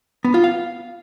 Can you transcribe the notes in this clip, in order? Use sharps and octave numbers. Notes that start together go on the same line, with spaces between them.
B3
F4
F5